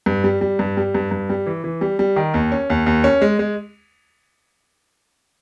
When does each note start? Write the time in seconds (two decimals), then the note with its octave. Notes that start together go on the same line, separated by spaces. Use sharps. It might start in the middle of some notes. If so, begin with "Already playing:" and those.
0.06 G2
0.24 G3
0.41 G3
0.59 G2
0.77 G3
0.95 G2
1.11 G2
1.30 G3
1.46 E3
1.64 E3
1.81 G3
1.99 G3
2.16 D#3
2.34 D#2
2.52 C#4
2.70 D#2
2.86 D#2
3.04 C#4
3.22 G#3
3.39 G#3